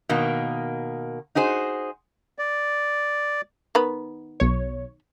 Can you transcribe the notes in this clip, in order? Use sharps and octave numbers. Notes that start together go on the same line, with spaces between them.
B2 D#3 A#3
D#4 F#4 G#4 C5
D5
D#3 B3 B5
B1 C#5